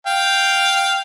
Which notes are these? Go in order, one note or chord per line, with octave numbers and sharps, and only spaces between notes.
F5 G5